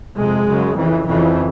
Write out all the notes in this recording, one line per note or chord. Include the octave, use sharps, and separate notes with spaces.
F2 C3 G#3
F#2 C#3
F2 C#3 E3
F2 C#3 E3